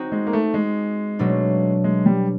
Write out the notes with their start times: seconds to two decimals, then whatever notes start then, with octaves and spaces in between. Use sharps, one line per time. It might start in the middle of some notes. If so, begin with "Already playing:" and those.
Already playing: C4 D#4 F#4
0.12 G#3
0.27 A#3
0.33 A3
0.54 G#3
1.19 B2 F#3 A3 D4
1.84 G#3
2.06 G3